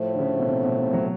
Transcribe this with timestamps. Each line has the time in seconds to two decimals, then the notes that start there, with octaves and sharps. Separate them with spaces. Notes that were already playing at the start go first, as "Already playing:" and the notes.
Already playing: A2 F3 A3
0.14 D3
0.19 C#3
0.39 B2
0.49 C3
0.63 B2
0.78 C3
0.93 F#3